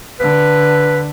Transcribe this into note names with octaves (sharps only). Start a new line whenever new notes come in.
D3 B4